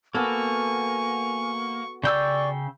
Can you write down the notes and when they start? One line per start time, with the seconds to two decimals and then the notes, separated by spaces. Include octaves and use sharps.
0.15 A#3 B3 F#4 A4 G#5 C#6
2.04 C#3 D5 G5 C#6 E6